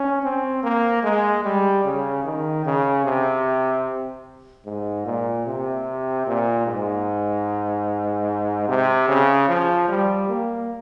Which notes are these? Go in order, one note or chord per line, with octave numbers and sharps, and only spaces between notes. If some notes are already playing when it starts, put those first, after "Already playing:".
Already playing: C#4
C4
A#3
G#3
G3
C#3
D#3
C#3
C3
G#2
A#2
C3
A#2
G#2
C3
C#3
F3
G3
A#3